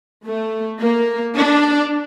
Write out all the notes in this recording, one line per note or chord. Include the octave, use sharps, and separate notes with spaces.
A3
A#3
D4